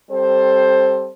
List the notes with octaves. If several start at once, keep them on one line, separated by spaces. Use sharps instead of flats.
G3 C4 A4 C5